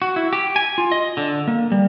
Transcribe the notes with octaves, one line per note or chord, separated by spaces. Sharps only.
F#4
E4
G4
G#5
F4
D#5
D3
A#3
G3